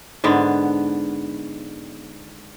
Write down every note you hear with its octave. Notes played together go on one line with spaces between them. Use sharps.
G#2 D3 B3